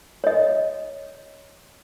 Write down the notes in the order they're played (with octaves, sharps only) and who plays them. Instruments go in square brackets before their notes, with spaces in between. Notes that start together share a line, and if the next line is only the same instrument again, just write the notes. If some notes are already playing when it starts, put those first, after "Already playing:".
[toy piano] C#5 D#5